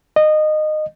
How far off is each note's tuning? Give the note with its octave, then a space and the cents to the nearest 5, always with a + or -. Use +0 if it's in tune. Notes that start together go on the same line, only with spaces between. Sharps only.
D#5 -20